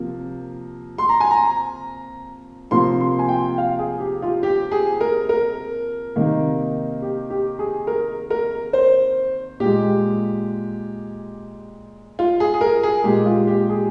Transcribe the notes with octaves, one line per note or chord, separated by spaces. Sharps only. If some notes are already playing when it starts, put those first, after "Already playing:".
Already playing: C3 F3 A#3
C6
A#5
G#5
A#5
C3 F3 A#3 C6
C6
G#5
G5
F5
G#4
G4
F4
G4
G#4
A#4
A#4
C3 D#3 A#3
G4
G4
G#4
A#4
A#4
C5
A#2 G#3 G4
F4
G#4
G#4
A#4
G#4
A#2 G#3 G4
F4
G4
G#4